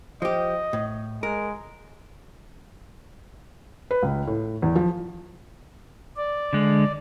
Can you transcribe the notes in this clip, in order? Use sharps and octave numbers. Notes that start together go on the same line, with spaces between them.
F3 G4 D#5
A2
G#3 A#4
B4
C#2
A2
E2
F3
D5
D3 G#3